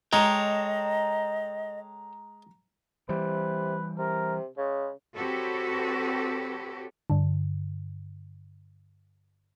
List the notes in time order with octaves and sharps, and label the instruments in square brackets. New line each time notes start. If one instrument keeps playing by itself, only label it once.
[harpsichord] G#3 [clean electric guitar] A4 C#5 G5 [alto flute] D#5 [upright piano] A#5
[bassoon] C3 [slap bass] E3 G3 [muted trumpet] B4
[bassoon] C3 [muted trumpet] A#4
[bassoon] C#3 [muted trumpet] G#3
[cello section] C4 F#4 G4 A4 B4 C#5
[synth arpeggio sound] G2 D3